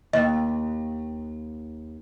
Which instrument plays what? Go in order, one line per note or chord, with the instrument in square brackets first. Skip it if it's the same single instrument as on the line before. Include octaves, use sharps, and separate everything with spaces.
[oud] D#2 [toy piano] D#5